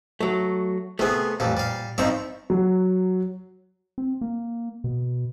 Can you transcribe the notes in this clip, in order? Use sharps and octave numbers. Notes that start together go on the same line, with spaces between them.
F#3 A3
C3 A3 B3 G#4
A1 F2 A#2 G3
G3 F5
G2 F3 C4 D#4 E5 C#6
F#3
C4
A#3
B2